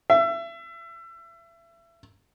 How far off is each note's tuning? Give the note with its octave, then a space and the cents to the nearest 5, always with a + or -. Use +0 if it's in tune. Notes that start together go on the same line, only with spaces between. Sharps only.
E5 +30